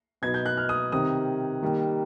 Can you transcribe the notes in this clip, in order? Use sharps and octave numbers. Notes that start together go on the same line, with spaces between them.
B2 F#3 B3 D#4 G#6
G6
F#6
F6
D#6
C3 D#3 G3 C4 D#6
D#3 G3 A#3